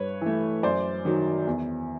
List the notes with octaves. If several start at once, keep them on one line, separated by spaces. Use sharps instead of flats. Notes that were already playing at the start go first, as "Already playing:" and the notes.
Already playing: G2 B4 C#5
E3 A3
F#2 C5 D5
D#3 F#3
E2